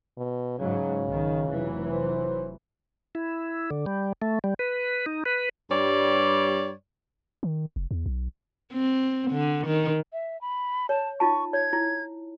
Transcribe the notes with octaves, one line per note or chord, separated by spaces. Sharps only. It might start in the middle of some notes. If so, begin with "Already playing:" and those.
B2
G#2 C#3 F#3
B1 D#3
F1 E3 F#3
C5
E4
D3
G3
A3
G3
B4
D#4
B4
G2 G3 C#5 D5
D#3
F1
E2
B1
C4
D3
D#3
E5
B5
C#5 A5
D#4 F4 A5 C#6
C#5 G#6
E4